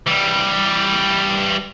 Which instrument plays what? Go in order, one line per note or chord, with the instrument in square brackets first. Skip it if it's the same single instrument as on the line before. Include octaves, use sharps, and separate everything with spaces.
[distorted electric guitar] E3 G3